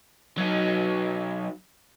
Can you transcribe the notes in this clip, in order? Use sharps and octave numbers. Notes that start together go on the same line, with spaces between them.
F#3 D#4